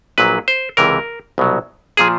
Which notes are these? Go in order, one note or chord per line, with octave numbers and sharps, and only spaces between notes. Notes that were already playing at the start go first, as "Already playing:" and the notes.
A#1 A#2 F#3 B4
C5
C#2 C3 E3 A#4
C2 B2 F#3
A#2 F3 G#4